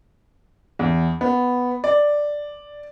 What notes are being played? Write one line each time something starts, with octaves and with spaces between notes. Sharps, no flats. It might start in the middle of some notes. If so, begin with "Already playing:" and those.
E2
B3
D5